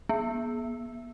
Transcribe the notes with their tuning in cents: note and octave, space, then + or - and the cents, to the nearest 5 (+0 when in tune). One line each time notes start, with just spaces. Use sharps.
B3 -45